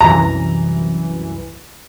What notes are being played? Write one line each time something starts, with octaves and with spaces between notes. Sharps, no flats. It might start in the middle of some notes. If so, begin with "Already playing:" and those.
C2 F#2 E3 A#5